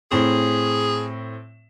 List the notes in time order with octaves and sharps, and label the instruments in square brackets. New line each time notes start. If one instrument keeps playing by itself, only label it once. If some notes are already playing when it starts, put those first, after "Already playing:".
[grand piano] A2 C4 [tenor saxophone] G#4